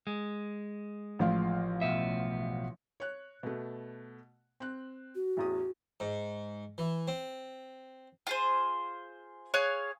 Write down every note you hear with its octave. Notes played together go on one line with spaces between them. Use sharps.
G#3
A1 F3 F5
B1 B3 E5
C#5 F#6
B2 A3
C4 F#6
F#4
A1 E2 D#6
G#2
E3
C4
F4 G#4 C5
G#4 C#5 F5 F#6